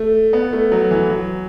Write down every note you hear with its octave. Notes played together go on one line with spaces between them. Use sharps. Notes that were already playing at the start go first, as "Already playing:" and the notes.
Already playing: A3
B3
A3
F#3
E3
F#3